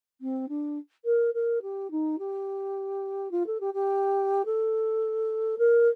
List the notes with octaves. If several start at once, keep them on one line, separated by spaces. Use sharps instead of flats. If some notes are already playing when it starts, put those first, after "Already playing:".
C4
D4
A#4
A#4
G4
D#4
G4
F4
A4
G4
G4
A4
A#4